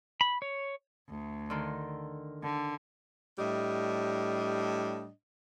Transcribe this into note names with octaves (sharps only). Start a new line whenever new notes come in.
B5
C#5
D2
D3 D#3 C6
D3
A2 G3 D4 D#5